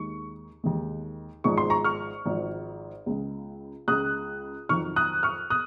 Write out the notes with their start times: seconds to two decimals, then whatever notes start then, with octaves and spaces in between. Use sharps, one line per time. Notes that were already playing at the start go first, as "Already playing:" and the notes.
Already playing: D#2 D#3 G#3 C#6
0.64 D#2 D#3 G#3
1.44 G#1 G#2 F3 G#3 C#6
1.58 C6
1.70 A#5 C#6
1.84 C#6 F6
2.26 G#1 G#2 F3 G#3
3.06 C#2 C#3 G#3
3.88 C#2 C#3 G#3 D#6 F#6
4.69 F2 D#3 F#3 C#6 F6
4.96 D#6 F#6
5.23 C#6 F6
5.50 D#6 F#6